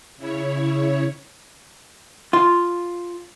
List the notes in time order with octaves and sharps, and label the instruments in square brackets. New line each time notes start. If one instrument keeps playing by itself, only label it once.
[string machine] C#3 E4 C#5
[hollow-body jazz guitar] F4